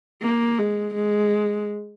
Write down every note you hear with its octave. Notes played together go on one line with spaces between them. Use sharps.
A#3
G#3
G#3